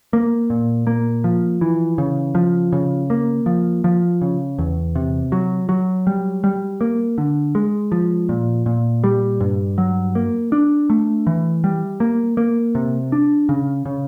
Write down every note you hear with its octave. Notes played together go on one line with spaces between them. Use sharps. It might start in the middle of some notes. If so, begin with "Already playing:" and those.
A#3
A#2
A#3
F3
E3
C#3
F3
C#3
A#3
F3
F3
C#3
E2
C3
F#3
F#3
G3
G3
A#3
D3
G#3
F3
A#2
A#2
G3
G2
F#3
A#3
D4
A3
E3
G3
A#3
A#3
C3
D4
C#3
C#3